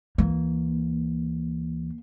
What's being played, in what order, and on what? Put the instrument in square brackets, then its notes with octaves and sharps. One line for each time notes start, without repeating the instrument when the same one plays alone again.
[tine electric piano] D2 E3 [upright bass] A#3